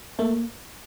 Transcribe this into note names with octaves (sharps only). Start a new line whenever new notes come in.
A3 A#3